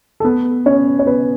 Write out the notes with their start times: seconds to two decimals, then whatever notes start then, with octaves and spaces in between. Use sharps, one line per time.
0.20 A4
0.25 B3 B4
0.66 C#4 C#5
0.99 C#5
1.07 B3 B4